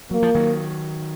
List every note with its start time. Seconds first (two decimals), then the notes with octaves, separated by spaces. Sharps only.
0.11 F#3 A#3
0.23 F3
0.35 D#3 F#3